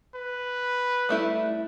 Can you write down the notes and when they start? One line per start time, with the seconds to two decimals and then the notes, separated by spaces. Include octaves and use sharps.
0.15 B4
1.09 G3 A3 E4